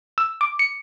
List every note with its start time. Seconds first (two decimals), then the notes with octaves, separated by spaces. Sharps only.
0.18 E6
0.41 D6
0.59 C#7